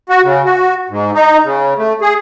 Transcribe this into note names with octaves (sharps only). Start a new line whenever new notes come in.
F#4
C#3
F#4
G#2
D#4
C#3
A3
G#4